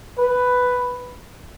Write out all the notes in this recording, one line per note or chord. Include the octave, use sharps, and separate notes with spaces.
B4